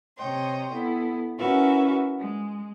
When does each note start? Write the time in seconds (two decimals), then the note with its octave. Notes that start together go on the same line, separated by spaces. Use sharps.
0.17 C3 C#5 D#5 G5 C6
0.74 B3 E4 A4
1.38 C#4 E4 F#4 A#4 B4 E5
2.18 G#3